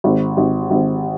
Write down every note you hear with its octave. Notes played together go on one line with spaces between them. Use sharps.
G#1
G#1
G#1